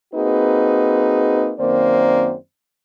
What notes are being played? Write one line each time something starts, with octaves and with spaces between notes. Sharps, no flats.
A#3 C4 D#4 F#4 G#4 B4
F#2 D#3 A#3 C4 C5 D5